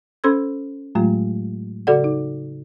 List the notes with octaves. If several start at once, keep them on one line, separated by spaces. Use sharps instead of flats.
C#4 A4 C5 C6 E6 G#6
A2 F#3 G#3 A3 F4
C#3 F#4 A4 D5 F#5
D#4